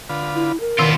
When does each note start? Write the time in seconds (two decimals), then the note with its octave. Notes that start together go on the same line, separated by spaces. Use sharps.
0.09 D3 F4 B4
0.35 E4
0.60 A#4
0.79 B2 D#3 E3 B3 C4 F4